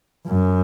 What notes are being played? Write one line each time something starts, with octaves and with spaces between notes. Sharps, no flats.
F#2